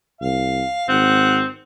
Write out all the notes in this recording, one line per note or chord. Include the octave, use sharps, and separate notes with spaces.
C2 F5
G#1 C4 F#5